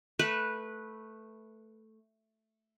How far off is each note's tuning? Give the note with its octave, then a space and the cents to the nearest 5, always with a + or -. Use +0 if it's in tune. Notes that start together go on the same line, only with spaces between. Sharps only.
A3 +0 B4 -10